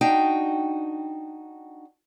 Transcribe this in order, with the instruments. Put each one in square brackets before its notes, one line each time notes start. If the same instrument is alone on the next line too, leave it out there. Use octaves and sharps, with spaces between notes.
[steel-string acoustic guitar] D4 D#4 F#4 G5